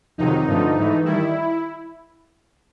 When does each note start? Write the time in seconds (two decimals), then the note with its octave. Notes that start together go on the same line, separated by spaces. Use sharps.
0.18 F2 C3 D#3 F#3 D#4
0.47 G2 D3 F3 A3
0.76 G#2 E3 A3
1.05 D#3 G3 E4